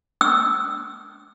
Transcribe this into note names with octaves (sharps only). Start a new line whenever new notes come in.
E6